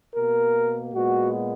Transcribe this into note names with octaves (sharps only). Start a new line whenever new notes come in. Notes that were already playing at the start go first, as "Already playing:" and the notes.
B2 A#3 A#4
A#2 G#3 B3 F#4